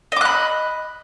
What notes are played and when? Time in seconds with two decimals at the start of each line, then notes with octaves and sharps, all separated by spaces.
0.12 D#5
0.16 D6
0.21 F#6
0.25 B5